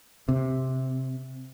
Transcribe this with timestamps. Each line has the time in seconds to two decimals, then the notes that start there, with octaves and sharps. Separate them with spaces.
0.28 C3